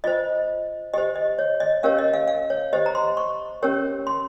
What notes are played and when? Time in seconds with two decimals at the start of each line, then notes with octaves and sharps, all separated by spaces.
0.04 F4 C5 D#5
0.94 G4 C5 D#5
1.16 D#5
1.39 C#5
1.60 D#5
1.83 C#4 G4 A#4 C#5 F5
1.99 D#5
2.13 F5
2.28 F5
2.50 C#5
2.73 G4 C5 D#5
2.86 A#5
2.95 C6
3.17 C#6
3.62 C#4 G4 A#4 C#5
4.07 C6